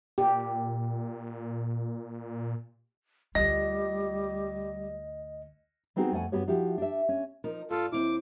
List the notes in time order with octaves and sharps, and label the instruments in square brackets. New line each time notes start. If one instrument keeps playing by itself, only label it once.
[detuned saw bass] A#2 [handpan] G4
[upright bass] D2 F4 [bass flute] G3 [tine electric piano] D#5 [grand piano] A#6
[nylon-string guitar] G3 B3 C4 D#4 F#4 G#4
F2 A3 F#5 G#5
G2 B3 F#4 G4 C#5
F3 E4 F#4 G4
D4 G4 E5
C#4
[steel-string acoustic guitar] F3 D#4 A#4
[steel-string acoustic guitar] G2 [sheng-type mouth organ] F4 A4
[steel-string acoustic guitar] D#2 C4 [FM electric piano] E4 [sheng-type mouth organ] D6